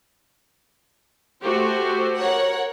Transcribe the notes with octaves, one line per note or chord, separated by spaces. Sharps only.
A3 F#4 G4 C5
A#4 C#5 F#5